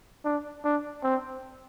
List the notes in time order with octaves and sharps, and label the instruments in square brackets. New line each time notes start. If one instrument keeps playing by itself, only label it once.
[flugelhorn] D4
D4
C4